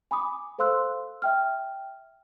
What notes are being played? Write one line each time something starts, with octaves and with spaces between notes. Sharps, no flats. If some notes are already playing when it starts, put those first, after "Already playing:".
G#5 B5 D6 D#6
A4 C5 F5 C6 E6 F#6
E5 G5 F6